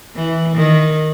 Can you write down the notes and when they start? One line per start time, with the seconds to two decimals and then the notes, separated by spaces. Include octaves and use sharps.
0.15 E3
0.56 D#3